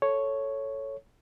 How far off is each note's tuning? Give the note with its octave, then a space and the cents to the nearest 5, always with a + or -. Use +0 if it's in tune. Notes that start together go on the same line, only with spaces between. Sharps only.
A4 +0 C#5 +0